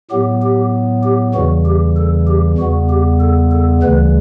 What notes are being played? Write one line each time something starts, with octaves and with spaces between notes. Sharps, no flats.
A2 F#3 B3 G4
G4
G4
E2 C#3 E3 G3 F#4
G4
A4
G4
E2 C#3 G3 B3 F#4
G4
A4
A4
D2 C#3 E3 G3 B4